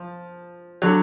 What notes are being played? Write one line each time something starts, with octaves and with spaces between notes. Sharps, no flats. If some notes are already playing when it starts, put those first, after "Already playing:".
Already playing: F3
D3 F#3